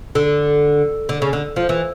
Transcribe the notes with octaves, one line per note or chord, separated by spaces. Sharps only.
D3
D3
C#3
D3
F3
E3